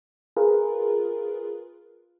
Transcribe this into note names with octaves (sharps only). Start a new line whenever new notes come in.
F4 G#4 A#4 B4